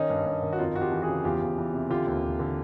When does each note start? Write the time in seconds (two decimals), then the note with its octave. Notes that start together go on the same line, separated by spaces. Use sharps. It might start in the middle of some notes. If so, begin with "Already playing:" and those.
Already playing: D#3 C#4 D#4
0.10 G2
0.26 G2
0.43 D#3
0.53 F#4
0.59 F2 D#4 F4
0.76 F2 F#4
0.81 F4 G4
0.92 E3
1.02 F#4 G#4
1.09 C#3
1.24 E2 F4 G4
1.41 E2
1.58 E3
1.73 C3
1.90 D3 F4 G4
2.06 D#2
2.23 D#2
2.39 D3